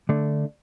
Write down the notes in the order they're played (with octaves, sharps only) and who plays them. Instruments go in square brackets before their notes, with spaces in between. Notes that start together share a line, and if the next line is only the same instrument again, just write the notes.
[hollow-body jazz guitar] D3 A3 D4